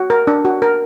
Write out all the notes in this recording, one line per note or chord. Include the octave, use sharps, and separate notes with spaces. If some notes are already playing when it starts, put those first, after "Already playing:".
Already playing: F#4
A#4
D4
F#4
A#4